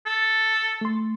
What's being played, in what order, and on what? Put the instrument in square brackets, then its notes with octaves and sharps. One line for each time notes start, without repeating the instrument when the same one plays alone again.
[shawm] A4
[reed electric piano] A3 C6